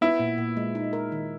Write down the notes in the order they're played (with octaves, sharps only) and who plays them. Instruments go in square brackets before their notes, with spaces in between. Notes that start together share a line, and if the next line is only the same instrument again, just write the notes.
[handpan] B3 [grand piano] E4
[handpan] A#2
A#2
G#3
D#4
A#4
D#3